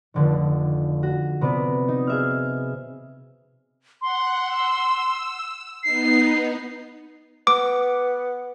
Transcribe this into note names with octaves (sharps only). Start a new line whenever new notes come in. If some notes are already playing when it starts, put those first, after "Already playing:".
F1 D3 D#3
F#4
C3 B3 B4 D5
D#4
G#4 E5 F6
F#5 C6
E6
B3 D#4 C7
B3 D6